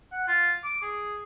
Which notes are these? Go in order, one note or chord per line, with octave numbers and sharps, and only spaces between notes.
F#5
F4
D6
G#4